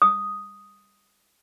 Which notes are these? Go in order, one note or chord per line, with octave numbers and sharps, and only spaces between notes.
D#6